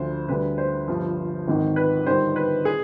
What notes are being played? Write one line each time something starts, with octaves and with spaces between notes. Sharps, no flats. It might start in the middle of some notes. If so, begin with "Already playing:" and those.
Already playing: D2 D3 F3 C5
D2 D3 G3 B4
C5
G1 G2 F3
G#1 G#2 D#3
B4
G1 G2 D#3 G3 C5
B4
G#4